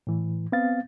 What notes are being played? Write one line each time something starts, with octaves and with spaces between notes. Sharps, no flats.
A2 E3
B3 C4 F5 A6